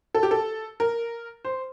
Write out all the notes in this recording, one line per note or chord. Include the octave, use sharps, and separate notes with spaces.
A4
G4
A4
A#4
C5